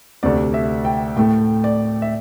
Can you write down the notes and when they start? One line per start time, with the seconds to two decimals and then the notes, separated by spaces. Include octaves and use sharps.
0.23 D2 C3 A3 D5
0.54 E5
0.85 G5
1.17 A2 A3 G5
1.64 D5
2.02 E5